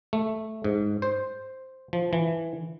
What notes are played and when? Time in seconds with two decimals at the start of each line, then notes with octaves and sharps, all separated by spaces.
0.13 A3
0.64 G#2
1.02 C5
1.93 F3
2.13 E3